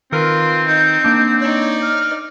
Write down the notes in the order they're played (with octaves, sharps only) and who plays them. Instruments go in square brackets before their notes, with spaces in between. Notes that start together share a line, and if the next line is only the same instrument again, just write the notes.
[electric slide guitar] D#3 A#4 B4 [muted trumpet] C4 [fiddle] F4
[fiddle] D#4 [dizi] G6
[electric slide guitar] A#3 D4
[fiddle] D#4 D5 [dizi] C#5
[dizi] F6